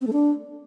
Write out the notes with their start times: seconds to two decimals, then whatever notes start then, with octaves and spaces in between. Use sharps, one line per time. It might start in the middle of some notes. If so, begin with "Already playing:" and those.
0.01 C4
0.07 A3
0.13 D4